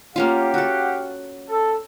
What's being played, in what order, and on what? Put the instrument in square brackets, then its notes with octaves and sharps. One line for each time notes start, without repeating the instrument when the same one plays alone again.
[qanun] A#3 C#4 F4 [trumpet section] G4 F5 F#5
[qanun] F#4 A4
[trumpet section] A4